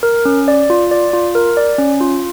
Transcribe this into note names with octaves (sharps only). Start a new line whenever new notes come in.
A#4
C#4
D5
F4
D5
F4
A#4
D5
C#4
F4